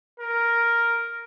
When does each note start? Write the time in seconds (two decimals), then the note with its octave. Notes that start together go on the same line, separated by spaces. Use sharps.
0.20 A#4